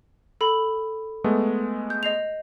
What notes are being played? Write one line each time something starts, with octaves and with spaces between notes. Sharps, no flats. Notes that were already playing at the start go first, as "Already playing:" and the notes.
A4 B5
G#3 A3 B3
G6
D#5 C7 F7